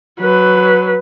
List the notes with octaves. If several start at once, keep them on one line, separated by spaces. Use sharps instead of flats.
F#3 B4